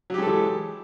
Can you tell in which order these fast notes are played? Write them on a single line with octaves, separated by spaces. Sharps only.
F#3 G4 G#3 A4 E3